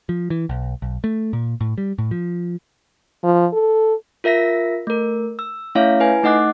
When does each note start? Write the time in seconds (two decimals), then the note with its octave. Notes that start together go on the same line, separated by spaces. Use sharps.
0.09 F3
0.30 E3
0.49 B1
0.82 B1
1.04 A3
1.33 A#2
1.61 A2
1.78 G3
1.98 A2
2.11 F3
3.24 F3
3.53 A4
4.24 F4 A#4 E5 A#6 B6
4.87 A3 A#4
5.39 E6
5.75 A3 C#4 E4 C#5 E5 F5
6.00 E4 B4 G#5
6.23 A3 D#4 D#5 F#5 D6 F#6